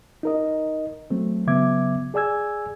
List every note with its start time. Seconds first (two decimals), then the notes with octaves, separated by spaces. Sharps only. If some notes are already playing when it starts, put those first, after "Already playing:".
0.23 D#4 A#4 D#5
1.10 F#3 A3 C4
1.47 C#3 F#3 B3 E5 D6 G#6
2.14 G#4 D5 G#5 E6 G#6